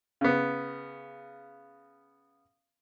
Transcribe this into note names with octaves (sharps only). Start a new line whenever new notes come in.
C#3 B3